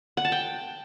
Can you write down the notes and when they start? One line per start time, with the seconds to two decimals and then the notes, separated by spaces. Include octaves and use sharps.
0.17 F#5
0.25 A5
0.32 G5